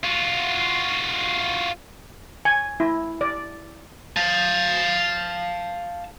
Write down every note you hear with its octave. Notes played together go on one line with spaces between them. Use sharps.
F4 F#4
G#5
E4
D5
F5 A5